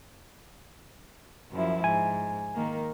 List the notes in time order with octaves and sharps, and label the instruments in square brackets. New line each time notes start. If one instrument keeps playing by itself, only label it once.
[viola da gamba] F#2 F3 E4
[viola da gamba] G#2 [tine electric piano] G#5
[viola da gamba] D#3 A#3